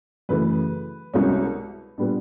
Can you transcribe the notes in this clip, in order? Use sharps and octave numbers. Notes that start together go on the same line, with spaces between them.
F#2 C#3 E3 A3 B4
C2 B2 G#3 C#4
A#2 G3 B3 D4